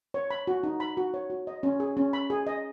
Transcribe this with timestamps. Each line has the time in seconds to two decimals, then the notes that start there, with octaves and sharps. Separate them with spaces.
0.14 C#5
0.31 B5
0.47 F#4
0.63 D#4
0.80 B5
0.97 F#4
1.14 C#5
1.30 F#4
1.47 D#5
1.63 C#4
1.80 G#4
1.97 C#4
2.13 B5
2.30 G#4
2.47 D#5